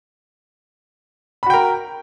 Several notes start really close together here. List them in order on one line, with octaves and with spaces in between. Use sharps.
B5 F#4 G5 A#4